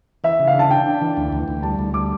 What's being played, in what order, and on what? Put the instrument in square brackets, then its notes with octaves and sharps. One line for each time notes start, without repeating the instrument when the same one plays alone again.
[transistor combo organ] E3 [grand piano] E5
[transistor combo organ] C#3
[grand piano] F5
[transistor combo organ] D4 [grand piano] A5
[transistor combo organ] D4 [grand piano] G5
[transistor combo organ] D4
E3
D2
D2
D2
[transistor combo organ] G3 [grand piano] A5
[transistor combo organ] D2
[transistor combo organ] G3 [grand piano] D6